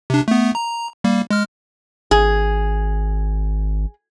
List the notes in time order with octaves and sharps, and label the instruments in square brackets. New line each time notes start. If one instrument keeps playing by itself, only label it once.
[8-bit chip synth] C3 D4
A3 B3
A#5
G3 A#3
G#3 F6
[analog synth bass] G#1 [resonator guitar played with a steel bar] G#4